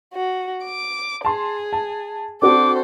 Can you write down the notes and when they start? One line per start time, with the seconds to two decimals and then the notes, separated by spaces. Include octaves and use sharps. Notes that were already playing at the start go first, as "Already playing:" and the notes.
0.14 F#4
0.64 D6
1.25 G#4 A5 C6
1.73 A5
2.42 C4 D4 F#4 A4 C5 D6